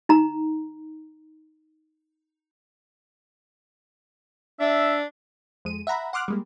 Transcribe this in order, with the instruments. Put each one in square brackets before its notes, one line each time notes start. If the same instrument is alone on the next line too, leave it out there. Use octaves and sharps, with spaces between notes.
[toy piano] D#4 A#5
[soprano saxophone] D4 [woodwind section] E5
[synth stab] F2 G#3 D#7
E5 F#5 A#5 B5
F#5 C6 D6 F6 F#6
G3 G#3 A#3